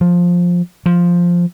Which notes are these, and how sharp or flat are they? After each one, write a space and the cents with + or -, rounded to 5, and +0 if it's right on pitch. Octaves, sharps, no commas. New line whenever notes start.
F3 +10
F3 +0